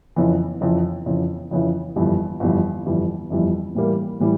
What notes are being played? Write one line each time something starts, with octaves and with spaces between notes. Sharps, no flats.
F2 C#3 E3
F2 C#3 E3
F2 C#3 E3
F2 C#3 E3
G1 F2 E3 G3
G1 F2 E3 G3
G1 F2 E3 G3
G1 F2 E3 G3
A2 E3 G3 A#3
A2 E3 G3